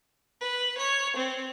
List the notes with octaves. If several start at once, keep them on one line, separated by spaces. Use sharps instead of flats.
B4
C#5
C4